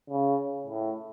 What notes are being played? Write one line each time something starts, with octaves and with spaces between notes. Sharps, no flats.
C#3
A2